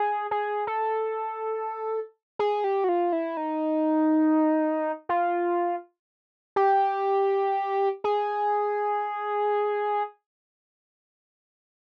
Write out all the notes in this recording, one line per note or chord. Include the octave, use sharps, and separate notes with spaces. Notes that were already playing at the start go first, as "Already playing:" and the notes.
Already playing: G#4
G#4
A4
G#4
G4
F#4
F4
E4
D#4
F4
G4
G#4